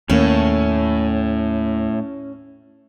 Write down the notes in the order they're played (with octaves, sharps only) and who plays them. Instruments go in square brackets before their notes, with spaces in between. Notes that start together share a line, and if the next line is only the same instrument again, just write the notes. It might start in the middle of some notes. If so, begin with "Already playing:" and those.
[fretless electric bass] D#2 A#3 [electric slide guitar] A2 [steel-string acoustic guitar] C#4